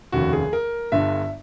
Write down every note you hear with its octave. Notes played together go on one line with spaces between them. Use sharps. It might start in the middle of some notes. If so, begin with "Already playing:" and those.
F1 D#2 C#3 F#4
G#4
A#4
G1 G2 D3 E5